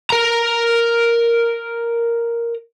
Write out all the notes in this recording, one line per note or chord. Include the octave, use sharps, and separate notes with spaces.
A#4 A#5